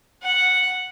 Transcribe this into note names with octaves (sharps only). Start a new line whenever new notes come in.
F#5